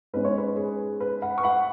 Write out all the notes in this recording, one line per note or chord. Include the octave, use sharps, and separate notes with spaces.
G#2 G#3 C#4 B4
C#5
B4
G#4
B4
F#5 B5
C#6
F#5 B5